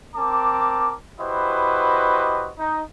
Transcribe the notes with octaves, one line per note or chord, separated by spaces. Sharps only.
C4 A#4 A5 D6
E4 F#4 G4 B4 C5 D#5
D#4